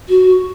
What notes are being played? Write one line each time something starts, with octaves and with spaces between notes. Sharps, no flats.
F#4